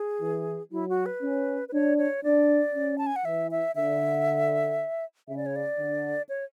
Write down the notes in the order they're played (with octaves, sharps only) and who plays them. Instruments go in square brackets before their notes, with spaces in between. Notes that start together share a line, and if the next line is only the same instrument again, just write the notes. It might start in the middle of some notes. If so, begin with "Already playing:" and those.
Already playing: [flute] G#4
[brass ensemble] E3
[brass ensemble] F#3 [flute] E4
[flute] F#4
B4
[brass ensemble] C#4
[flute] B4
[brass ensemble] D4 [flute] C#5
[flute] C#5
[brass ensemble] D4 [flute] D5
[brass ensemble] C#4
[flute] A5
G#5
F#5
[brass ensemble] E3 [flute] E5
[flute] E5
[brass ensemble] D3 [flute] E5
[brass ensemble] C#3 [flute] E5
[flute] D5
C#5
D5
[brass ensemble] D3
[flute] C#5